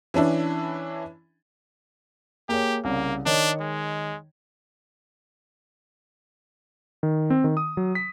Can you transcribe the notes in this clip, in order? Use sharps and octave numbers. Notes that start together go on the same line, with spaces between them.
E3 C#4 D4 E4
A#3 G4 G#4 C#5
C2 C#3 A#3
D#3 D4 C#5 D#5
G#3
D#3
C4
D#3
D#6
F#3
B6